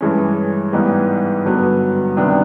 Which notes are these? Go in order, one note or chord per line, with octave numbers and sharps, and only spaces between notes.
G2 E3 G#3 C#4
G#2 E3 G3 B3 D#4
G2 D3 F#3 B3
C3 D#3 G3 B3 D4